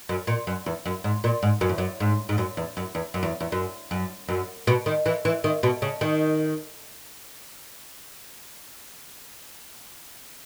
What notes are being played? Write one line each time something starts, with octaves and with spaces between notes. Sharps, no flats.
F#2
A#2
F#2
E2
F#2
G#2
A#2
G#2
F#2
E2
F#2
G#2
G#2
F#2
E2
F#2
E2
F#2
E2
E2
F#2
F#2
F#2
B2
D#3
E3
E3
D#3
B2
C#3
D#3